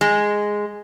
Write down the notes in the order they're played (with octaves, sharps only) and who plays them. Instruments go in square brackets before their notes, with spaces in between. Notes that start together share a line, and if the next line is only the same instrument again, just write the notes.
[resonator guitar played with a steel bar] G#3